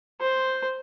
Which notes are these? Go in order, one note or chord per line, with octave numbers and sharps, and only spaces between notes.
C5